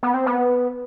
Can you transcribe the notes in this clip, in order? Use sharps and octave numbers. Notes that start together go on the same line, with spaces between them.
B3
C4
B3